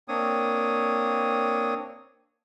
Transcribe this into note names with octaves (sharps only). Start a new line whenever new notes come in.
A#3 C4 D4 C#5 D#6